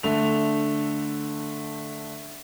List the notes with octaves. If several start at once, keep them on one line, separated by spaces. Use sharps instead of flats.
D3 A3 F7